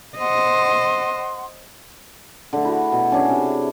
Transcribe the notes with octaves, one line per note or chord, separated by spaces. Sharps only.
C5 D#5 F#5 C6
D3 A3
E4 F#4
B2
C#4 D4 G#4
C3